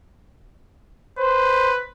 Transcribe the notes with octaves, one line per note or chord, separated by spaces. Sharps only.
B4 C5